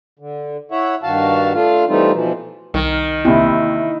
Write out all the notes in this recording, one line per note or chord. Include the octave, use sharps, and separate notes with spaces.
D3
E4 C#5 E5 F#5
G2 D#3 F#4 F5 A5
A3 D4 F4 F5
E3 G3 A3 C4 D#4 F4
B2 E3 F3
C2 D#3
D#2 C3 E4